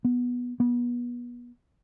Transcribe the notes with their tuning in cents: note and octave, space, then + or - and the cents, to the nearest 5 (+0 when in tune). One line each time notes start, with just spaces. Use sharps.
B3 -10
B3 -30